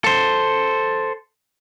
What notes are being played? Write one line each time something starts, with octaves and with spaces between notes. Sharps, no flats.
A4 C5